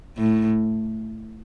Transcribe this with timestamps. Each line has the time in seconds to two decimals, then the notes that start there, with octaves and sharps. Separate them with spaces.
0.17 A2